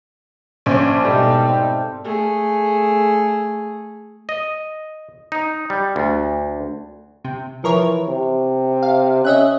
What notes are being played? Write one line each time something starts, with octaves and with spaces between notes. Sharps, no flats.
A#1 C#4 C5 D5 F5 A5
G#2 B2 G3 D#4 A4 E5 G5 G#5
C4 G5
A3 G#4
D#5
D#4
G3
D2
C3
E3 F3 A#4 C#5
C3
F5
C#4 D#5 E5 F#6